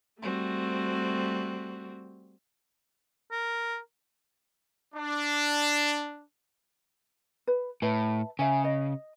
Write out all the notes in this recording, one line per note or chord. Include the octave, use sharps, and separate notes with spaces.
G3 A3 C4 F#4
A#4
D4
B4
A2 B4 E5 A5
C#3 E5 G#5
D#5